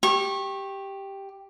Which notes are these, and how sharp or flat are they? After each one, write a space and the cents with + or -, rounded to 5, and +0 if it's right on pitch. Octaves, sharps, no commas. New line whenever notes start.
G4 +0 C#6 -25